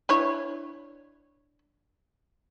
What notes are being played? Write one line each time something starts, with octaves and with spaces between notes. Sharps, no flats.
D4 E4 C#5